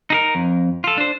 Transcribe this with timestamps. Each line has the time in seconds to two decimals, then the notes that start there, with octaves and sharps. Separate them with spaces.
0.10 D#4 G#4 A#4
0.35 F2
0.84 F4 A4
0.98 D4 C5